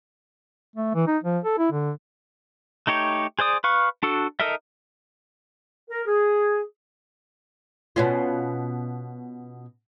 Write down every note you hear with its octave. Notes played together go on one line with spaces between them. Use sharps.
A3
E3
D#4
F3
A4
E4
D3
A3 D#4 G4 C#5
G#4 C5 D5 D#6
B4 F5 C#6
D4 F#4 A4
D#4 A4 A#4 D#5 E5
A#4
G#4
B2 C#4 F4